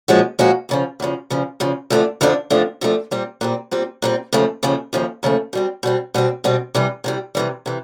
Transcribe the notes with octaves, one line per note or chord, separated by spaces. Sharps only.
A#2 F3 G#3 C#4 F#4
A#2 F3 G#3 C#4 F#4
E2 C#3 F3
E2 C#3 F3
E2 C#3 F3
E2 C#3 F3
F2 D3 F3 A3 D4
F2 D3 F3 A3 D4
F2 D3 F3 A3 D4
F2 D3 F3 A3 D4
A#2 G3 C4
A#2 G3 C4
A#2 G3 C4
A#2 G3 C4
D#2 C#3 F3 A3
D#2 C#3 F3 A3
D#2 C#3 F3 A3
D#2 C#3 F3 A3
B2 G3 C4
B2 G3 C4
B2 G3 C4
B2 G3 C4
C3 E3 G3
C3 E3 G3
C3 E3 G3
C3 E3